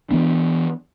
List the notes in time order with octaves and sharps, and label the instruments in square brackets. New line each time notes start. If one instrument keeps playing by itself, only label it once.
[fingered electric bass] E3 B3 D4